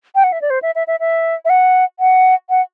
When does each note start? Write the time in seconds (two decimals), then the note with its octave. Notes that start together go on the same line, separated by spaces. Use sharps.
0.15 G5
0.24 F#5
0.32 E5
0.41 D5
0.50 C5
0.62 E5
0.75 E5
0.87 E5
1.00 E5
1.45 E5
1.50 F#5
2.00 F#5
2.50 F#5